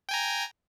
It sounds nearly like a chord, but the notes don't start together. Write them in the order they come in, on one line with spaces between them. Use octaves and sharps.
G5 G#5 A#5